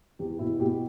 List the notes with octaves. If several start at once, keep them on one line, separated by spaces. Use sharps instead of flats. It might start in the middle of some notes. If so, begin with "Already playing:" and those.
E2 G4
B2 E4
B2 G4